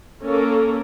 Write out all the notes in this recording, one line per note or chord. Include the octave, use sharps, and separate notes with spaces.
A#3 C#4 A4 A#4